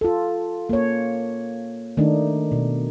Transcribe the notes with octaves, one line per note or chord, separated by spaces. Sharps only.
F4 A4
A#3 C#5
D#3 A3 D4 D#4
B2